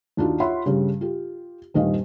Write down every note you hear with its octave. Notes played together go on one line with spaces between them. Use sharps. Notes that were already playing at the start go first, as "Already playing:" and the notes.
D#2 D4 D#4 F4 F#4
F4 C#5 E5 F#5 B5 C6
G2 C#3 G3
F4 G4
D#1 G2 D#3 G3 D#5 F5